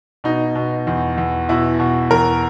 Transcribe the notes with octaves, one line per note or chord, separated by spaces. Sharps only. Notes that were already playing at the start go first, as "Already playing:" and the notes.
B2 D#4
B2
E2
E2
B2 E4
B2
E2 A#4